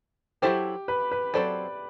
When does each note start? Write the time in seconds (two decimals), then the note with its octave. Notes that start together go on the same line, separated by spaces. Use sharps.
0.42 F#3 C4 E4 G4 A4 C5
0.88 B4
1.11 B4
1.34 F#3 C4 E4 A4 C5 D5